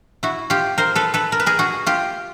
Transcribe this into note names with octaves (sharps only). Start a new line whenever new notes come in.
E4 F#4
F4 G4
A#4 C5
A4 B4
A4 B4
A#4
B4
G#4 A#4
F#4 G#4
F4 G4